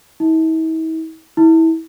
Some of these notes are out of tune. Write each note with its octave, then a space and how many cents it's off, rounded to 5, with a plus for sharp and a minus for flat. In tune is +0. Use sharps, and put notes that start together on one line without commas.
E4 -45
E4 -25